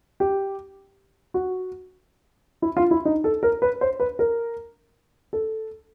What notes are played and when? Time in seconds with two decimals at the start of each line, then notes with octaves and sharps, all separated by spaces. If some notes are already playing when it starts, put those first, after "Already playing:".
0.20 G4
1.34 F#4
2.62 E4
2.77 F4
2.91 E4
3.05 D#4
3.24 A4
3.43 A#4
3.62 B4
3.81 C5
4.00 B4
4.19 A#4
5.33 A4